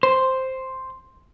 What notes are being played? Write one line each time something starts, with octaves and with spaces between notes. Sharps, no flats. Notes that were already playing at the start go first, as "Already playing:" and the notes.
C5